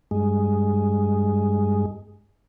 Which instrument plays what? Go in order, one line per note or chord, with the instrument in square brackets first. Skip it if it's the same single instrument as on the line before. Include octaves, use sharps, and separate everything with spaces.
[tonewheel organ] G2 G#3